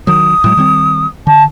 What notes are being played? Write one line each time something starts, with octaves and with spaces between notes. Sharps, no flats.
D#3 F#3 D#6
A2 F#3 G#3
D#3 G3 C4
D3 A5